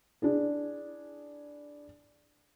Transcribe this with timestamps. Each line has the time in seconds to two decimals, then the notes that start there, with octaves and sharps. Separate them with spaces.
0.22 D4 E4 G#4